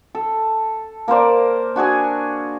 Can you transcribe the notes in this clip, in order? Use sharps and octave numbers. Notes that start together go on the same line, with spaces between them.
A4
A#3 A#4 C5 D5
D4 F#4 G#4 G#5